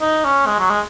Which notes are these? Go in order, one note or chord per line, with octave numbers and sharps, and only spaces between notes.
D#4
C#4
G#3
F#3
G#3